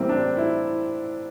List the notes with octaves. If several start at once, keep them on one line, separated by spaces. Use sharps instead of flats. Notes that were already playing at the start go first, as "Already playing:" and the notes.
Already playing: A2 E3 G3 A#3 C4
D4
E4